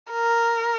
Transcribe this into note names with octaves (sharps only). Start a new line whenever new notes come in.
A#4